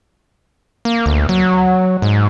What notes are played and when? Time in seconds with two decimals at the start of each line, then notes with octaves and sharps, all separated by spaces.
0.85 A#3
1.06 D2
1.29 F#3
2.02 G#2